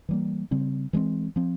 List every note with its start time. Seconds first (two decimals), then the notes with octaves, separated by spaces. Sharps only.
0.09 E3 G3 A#3
0.51 C#3 G3 C4
0.93 E3 G#3 C4
1.36 F3 C4